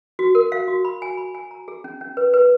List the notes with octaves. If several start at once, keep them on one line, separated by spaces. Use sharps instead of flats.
F#4
A#4
F5
F#4
B5
G#5
B5
G#5
A#5
G#4
C#4
C#4
B4
B4